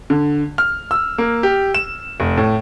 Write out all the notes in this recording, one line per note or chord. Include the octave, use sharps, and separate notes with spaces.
D3
F6
E6
A#3
G4
E7
F1
A2